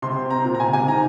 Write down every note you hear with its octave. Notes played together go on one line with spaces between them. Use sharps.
C3 C6
C4
C4 A#5
A#2
A#5
C3 G#5
C3 G#5
D#3 A#5